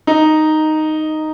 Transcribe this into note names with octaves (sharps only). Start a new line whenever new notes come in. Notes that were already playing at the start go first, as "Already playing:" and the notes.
D#4